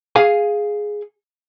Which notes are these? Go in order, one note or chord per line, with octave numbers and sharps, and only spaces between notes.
G#4 F5 G#5